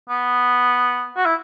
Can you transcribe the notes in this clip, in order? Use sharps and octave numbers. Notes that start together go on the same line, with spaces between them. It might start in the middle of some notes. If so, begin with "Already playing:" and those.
B3
F#4
E4